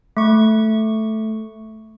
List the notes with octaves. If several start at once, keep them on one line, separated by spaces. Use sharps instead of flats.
A3 C#6